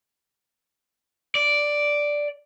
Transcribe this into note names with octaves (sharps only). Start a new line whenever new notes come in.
D5